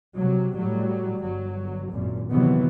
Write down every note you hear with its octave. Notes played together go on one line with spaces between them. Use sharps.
C3 F#3
A2 F#3 G3
G1 F#3
G#1 F#2 A#2
C3 D#3 E3 F#3 B3